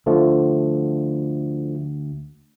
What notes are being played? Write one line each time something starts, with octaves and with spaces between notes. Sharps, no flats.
D2 D3 F3 A3